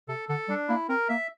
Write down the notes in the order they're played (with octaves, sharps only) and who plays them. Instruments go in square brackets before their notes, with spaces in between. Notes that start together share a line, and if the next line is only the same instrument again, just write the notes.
[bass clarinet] C3 [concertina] A4
[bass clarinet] D3 [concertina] A4
[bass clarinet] G3 [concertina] D4
[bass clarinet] A#3 [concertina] E4
[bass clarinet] C4 [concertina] A#4
[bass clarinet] A#3 [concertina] E5